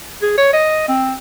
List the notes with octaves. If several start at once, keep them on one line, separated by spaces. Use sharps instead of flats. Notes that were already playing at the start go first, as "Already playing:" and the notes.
G#4
C#5
D#5
C4